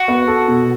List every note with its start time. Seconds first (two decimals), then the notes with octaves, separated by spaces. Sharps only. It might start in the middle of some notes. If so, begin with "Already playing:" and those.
Already playing: F#4
0.08 B3
0.28 A4
0.48 B2